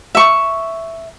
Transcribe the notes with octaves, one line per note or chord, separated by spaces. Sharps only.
E5 C#6